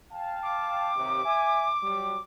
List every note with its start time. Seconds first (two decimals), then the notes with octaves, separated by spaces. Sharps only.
0.13 F5 G5 A5
0.42 D6
0.96 D#2 C3
1.25 E5 G#5
1.83 F#3 G3